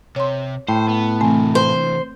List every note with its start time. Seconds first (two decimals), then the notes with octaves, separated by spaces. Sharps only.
0.16 C3 C#5 C6
0.68 A2 C5 G5
0.88 B3
1.21 C3 E3 A3 C4 G#5
1.55 C5